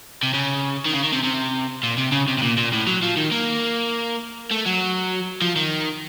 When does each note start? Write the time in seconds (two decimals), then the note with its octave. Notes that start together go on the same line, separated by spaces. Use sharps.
0.23 C3
0.34 C#3
0.85 D#3
0.93 C#3
1.03 D#3
1.12 C3
1.23 C3
1.83 A#2
1.98 C3
2.12 C#3
2.28 C3
2.38 C3
2.43 A#2
2.57 A#2
2.73 A2
2.87 F#3
3.03 F3
3.17 D#3
3.32 A#3
4.51 A3
4.66 F#3
5.42 F3
5.56 D#3